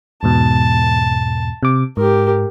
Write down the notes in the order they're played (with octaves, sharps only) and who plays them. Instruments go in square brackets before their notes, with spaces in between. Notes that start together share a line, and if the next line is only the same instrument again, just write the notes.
[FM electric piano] E2 G#2 B2 [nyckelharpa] A5
[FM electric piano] C3 D6
[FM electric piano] G#2 [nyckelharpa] G4 A#4